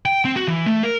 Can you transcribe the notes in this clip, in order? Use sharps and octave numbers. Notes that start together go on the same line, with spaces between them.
G5
C4
F#4
E3
A3
A#4